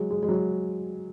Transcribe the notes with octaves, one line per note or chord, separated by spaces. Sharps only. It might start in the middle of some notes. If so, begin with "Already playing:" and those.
Already playing: F#3 G#3
G#3
G#3
F#3